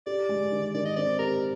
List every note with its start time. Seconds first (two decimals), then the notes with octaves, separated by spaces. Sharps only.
0.06 G4 D5
0.29 G#3
0.52 D#3
0.74 D#3 D5
0.85 D#5
0.96 C4 D5
1.19 G4 A#4